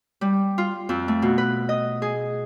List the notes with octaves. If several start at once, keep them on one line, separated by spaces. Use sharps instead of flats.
G3
F4
F2
A3
B2
B4
D#5
G#4